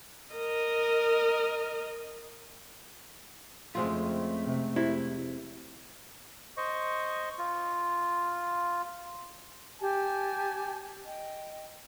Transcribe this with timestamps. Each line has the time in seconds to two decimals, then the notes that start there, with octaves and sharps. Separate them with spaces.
0.35 A#4 D#5
3.75 F2 C#3 G#3 A3 C4 F4
4.44 C3
4.76 F1 C3 E4
6.57 C5 D#5 C#6
7.38 F4
9.79 G4 G#5 A5
11.06 D#5 G5